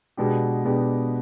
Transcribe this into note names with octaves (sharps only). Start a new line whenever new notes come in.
B2 G#3 B3 D4 G4
B2 G#3 B3 D4 G4